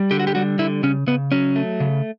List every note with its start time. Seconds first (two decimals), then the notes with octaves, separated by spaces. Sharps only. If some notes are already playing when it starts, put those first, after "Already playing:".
Already playing: G3
0.11 D3 G4
0.20 F#4
0.27 G4
0.35 G3 F#4
0.59 D3 E4
0.83 C#3 C#4
1.07 C#3 B3
1.32 F#3 C#4
1.56 A3
1.80 C#3